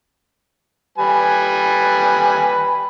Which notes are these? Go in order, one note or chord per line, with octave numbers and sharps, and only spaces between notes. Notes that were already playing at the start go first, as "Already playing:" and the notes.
G3 B4 G#5